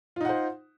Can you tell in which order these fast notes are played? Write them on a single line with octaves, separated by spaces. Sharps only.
F4 D#4 F#5 C5